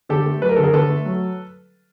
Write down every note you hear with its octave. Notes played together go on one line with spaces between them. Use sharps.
D3 G4 A4
A3
F#3 B4
A#4
D3 A4
G#4 A#4
D3 A4 B4
A3
F#3